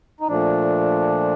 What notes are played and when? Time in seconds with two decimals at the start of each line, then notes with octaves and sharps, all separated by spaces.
0.20 D#4
0.28 A#2 F3 A3 D4